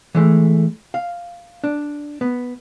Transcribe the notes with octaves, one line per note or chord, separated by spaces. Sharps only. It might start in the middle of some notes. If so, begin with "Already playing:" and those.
E3 G#3 A3
F5
D4
B3